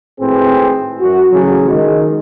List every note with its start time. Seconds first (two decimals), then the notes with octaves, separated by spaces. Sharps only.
0.20 G#1 A2 C4 G#4 B4
1.01 F#2 F#4
1.31 A1 C#3 F#3
1.68 D#3 G#3